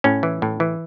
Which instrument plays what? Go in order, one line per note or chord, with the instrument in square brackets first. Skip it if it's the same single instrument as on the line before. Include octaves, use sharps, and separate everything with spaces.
[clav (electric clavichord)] A2 C#4
E3
A2
E3